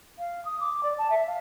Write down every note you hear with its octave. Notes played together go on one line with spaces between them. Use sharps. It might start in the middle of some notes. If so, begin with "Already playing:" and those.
F5
D#6
D6
D5
A5
E5
F5